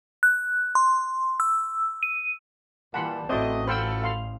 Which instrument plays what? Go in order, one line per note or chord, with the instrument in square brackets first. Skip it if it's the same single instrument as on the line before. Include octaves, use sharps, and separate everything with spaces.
[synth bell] F#6
C6
E6
D#7
[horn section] A#2 G3 [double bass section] E3 [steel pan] F#5 B5 C6 [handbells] A5
[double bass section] A1 [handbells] C4 F#4 [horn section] E4 A4 D#5 [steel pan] C5 D5
[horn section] F4 F#4 A4 [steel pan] C5 G5 E6 [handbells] B5 F6
[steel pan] F5 C6